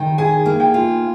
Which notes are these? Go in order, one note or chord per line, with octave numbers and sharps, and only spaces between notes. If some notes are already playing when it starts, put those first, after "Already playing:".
Already playing: D#3 G5
G#4 G#5
A#3
G5
F4